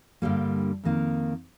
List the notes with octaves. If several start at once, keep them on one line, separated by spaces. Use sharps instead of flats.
G2 D3 G3 A#3
F2 D#3 A#3